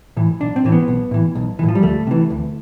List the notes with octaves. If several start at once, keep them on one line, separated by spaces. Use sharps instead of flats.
A2 E3
B1 D4
C4
A2 E3
B3
B1
A2 E3
B1
E3
A2
F3
G3
D2 A3
C3 E3
D2